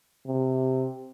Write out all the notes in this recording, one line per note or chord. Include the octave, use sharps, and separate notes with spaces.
C3